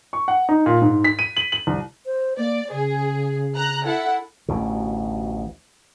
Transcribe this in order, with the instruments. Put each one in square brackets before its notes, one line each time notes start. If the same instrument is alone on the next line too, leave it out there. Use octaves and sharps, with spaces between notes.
[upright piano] C#6
F#5
D#4
A#2
G#2
B6
D#7
F#7
F#7
C2
[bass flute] C5
[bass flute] A#3 [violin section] D5
[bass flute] C#3 [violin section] G#4
[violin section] A#5 F#6
E4 A4 F#5
[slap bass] A1 D2 B2